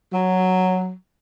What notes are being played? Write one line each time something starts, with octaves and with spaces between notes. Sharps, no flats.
F#3